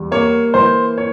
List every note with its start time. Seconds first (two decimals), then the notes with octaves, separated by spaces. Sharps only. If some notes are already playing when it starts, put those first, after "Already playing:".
Already playing: E2 G3
0.11 A#3 C#5
0.54 E3 C5
0.98 C#5